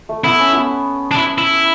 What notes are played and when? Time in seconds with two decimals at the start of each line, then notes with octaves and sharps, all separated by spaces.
0.09 A3
0.24 B3 E4
0.39 C#4
0.55 B3
1.11 D4
1.16 E4
1.38 E4